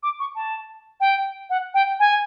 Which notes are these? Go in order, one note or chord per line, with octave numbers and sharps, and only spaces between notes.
D6
C#6
A5
G5
F#5
G5
G#5